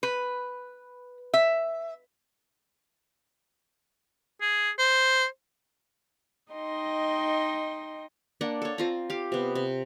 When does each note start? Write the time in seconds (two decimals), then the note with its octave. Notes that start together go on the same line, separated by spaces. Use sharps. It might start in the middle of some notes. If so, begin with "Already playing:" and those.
0.03 B4
1.34 E5
4.42 G#4
4.79 C5
6.52 D#4 D#5 G5 C6
8.41 A#3 D4 F#5
8.62 A4 C#5
8.78 C4 F4 A#5
9.10 G4 F5
9.32 C3 B3
9.55 C3